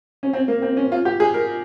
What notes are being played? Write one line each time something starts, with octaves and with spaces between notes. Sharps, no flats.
C#4
C4
A#3
C4
C#4
F4
G4
G#4
A#4